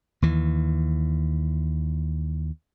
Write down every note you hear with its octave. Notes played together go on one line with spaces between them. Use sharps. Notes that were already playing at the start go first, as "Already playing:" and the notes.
D#2 E3